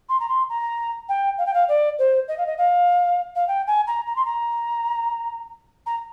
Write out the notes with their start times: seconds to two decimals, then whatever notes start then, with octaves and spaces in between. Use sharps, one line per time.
0.09 C6
0.20 A#5
0.29 C6
0.49 A#5
1.09 G5
1.38 F5
1.46 G5
1.54 F5
1.68 D5
1.99 C5
2.28 D#5
2.38 F5
2.46 D#5
2.58 F5
3.36 F5
3.48 G5
3.67 G#5
3.87 A#5
4.07 A#5
4.16 C6
4.25 A#5
5.86 A#5